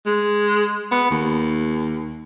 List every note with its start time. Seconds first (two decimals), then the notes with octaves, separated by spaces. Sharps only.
0.06 G#3
0.91 B3
1.11 D#2